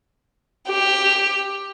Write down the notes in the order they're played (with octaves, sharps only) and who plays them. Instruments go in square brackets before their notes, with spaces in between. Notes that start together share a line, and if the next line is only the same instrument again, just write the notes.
[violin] G4